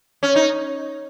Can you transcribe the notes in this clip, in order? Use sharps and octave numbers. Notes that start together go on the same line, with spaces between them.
C#4
D#4